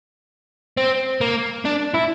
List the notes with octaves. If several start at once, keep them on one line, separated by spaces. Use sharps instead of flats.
C4
A#3
D4
E4